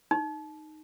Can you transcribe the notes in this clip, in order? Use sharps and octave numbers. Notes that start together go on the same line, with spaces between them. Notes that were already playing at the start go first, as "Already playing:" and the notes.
D#4